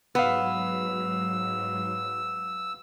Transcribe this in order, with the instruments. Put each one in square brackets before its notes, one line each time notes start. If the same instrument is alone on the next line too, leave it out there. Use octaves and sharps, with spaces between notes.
[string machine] G#2 F#3 [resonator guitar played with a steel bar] B3 [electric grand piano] B4 F5 [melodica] E6